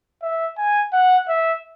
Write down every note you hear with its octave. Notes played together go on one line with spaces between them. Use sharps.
E5
G#5
F#5
E5